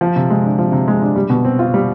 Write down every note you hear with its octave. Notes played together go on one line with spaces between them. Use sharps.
F3
C3
G#3
D4
F3
C3
G#3
D4
G3
B2
C4
F4
G3